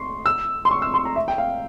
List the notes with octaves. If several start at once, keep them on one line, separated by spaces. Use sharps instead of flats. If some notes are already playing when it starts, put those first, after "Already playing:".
Already playing: C6 C#6
E6
C6
C#6
E6
C6
A#5
E5
G5
F5